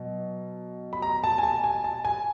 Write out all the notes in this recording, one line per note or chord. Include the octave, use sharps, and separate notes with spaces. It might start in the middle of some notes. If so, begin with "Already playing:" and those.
Already playing: B2 F#3
B5
A#5
A5
G#5
A5
G#5
A5
G#5